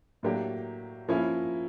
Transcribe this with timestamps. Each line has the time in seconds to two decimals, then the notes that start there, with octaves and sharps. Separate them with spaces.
0.23 A2 F#3 A#3 D4 G4
1.08 F3 A#3 C#4 E4